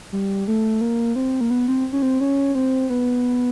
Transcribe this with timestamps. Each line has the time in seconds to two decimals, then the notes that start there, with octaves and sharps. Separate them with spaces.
0.12 G3
0.48 A3
0.81 A#3
1.16 C4
1.41 A#3
1.50 B3
1.68 C4
1.93 C#4
2.02 C4
2.21 C#4
2.55 C4
2.90 B3